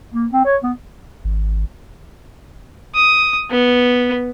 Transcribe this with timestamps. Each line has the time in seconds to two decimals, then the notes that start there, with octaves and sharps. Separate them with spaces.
0.14 A#3
0.32 C4
0.45 C#5
0.63 B3
1.25 G#1
2.95 D#6
3.50 B3